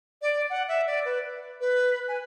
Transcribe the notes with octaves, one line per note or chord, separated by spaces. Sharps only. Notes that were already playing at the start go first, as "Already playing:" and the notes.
D5
F#5
E5
D5
B4
B4
G#5